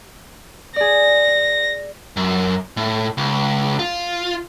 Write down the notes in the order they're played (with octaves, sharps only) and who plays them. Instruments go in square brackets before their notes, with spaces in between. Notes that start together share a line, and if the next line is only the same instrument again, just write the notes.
[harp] G#4 D5 [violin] A#6
[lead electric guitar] F#2
A2
C#2
F4